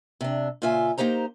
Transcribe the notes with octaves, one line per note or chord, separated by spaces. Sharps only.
C3 D4
A#2 C#3 F4 E5 G#5
A#3 D#4 G4 C5 A#5